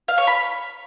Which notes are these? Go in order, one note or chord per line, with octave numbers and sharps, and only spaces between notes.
F5
C#5
B5